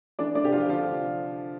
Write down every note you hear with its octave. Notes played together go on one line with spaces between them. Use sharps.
E3 D4 D5
D4 D5
C3 G4
F3 F4
D3 F3 F4